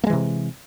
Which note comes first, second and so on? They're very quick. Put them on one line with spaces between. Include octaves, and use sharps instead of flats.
A#3 G#3 E3 C3